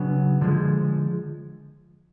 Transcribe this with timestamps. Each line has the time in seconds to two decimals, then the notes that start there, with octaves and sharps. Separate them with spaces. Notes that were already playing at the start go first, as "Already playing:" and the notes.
Already playing: C#3 F#3 B3 D4
0.41 D3 F3 G#3